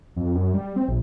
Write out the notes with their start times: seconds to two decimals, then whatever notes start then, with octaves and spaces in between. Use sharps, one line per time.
0.16 F2
0.35 F#2
0.54 G3
0.76 C4
0.88 A#1